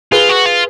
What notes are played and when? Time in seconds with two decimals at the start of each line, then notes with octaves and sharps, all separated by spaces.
0.12 F4 G#4 B4
0.29 F#4
0.46 F4